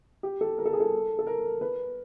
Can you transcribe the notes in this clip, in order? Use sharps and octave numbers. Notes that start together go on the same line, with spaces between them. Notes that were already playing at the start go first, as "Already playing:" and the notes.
G4
A4
A#4
A4
G#4
A4
A4
A#4
B4